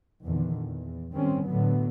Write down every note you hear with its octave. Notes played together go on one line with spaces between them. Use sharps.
E2 A#2 D3 D#3
E2
D#3 G3 C4 C#4
A2 D3 F#3 B3